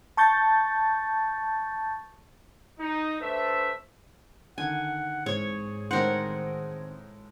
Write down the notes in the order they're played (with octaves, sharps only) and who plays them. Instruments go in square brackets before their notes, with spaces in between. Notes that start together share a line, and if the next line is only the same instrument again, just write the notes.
[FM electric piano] A5 C#6 G6 A6
[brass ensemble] D#4
A3 D4 B4 C5 E5
[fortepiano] D3 D#3 [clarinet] F#5 [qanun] G#5
[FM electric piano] G#2 [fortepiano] E3 C4 [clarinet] G#4 [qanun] C#5
[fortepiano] A2 E3 G#3 [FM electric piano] D#3 C4 C5 [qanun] A#4 F#5